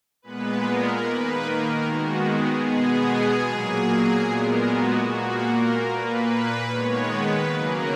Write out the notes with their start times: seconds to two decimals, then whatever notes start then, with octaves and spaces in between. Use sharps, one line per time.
0.22 A#2 G#3 B3 B4
0.63 A#4
1.03 D#3 A#3 B4
1.43 A#4
1.84 D#3 G#3 B3 F#4
2.25 G#4
2.65 B2 G#3 B3 G#4
3.46 A#2 F#3 A#3
4.26 A#2 G#3 B3 A#4
4.66 F#4
5.07 A#2 A#3 F#4
5.47 A#4
5.87 A#2 A#3 B4
6.68 D#3 G#3 B3 C#5
7.08 B4
7.48 C#3 F#3 A#3 A#4